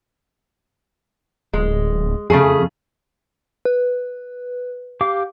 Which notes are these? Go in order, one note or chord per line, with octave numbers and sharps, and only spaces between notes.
D1 G#3
F2 C#3 A3 G#4
B4
G4 F5 D6